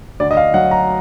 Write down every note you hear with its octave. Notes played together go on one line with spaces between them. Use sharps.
D2 D5
D#5
F5
F#3 F#5
A#5